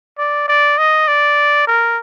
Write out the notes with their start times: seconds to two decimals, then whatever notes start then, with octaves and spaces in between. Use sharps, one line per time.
0.18 D5
0.48 D5
0.78 D#5
1.08 D5
1.67 A#4